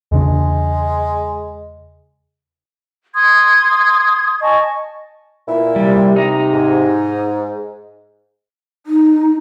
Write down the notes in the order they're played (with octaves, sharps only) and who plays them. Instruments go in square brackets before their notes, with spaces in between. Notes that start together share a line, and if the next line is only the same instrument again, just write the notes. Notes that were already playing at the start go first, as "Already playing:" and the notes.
[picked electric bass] E2 C#3 D4 [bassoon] G#3
[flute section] C6 D#6 G#6
D#5 G#5 A5 C#6
[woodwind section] A#2 E4
[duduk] C3 [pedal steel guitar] G3
[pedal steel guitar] D#4 A#5
[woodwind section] G#2
[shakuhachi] D#4